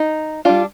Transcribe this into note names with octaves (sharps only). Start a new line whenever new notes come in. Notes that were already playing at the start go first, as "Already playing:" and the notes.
Already playing: D#4
G3 D4 F4